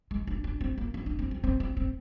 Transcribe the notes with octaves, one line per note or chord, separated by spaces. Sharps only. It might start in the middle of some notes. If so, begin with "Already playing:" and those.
G#3
D4
D4
C4
A#3
C4
D4
C4
C4
C4
C4
C4